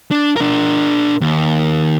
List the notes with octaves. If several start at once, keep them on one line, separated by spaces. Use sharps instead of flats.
D4
D4 A#4
D#2